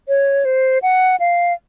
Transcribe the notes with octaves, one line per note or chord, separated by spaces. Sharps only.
C#5
C5
F#5
F5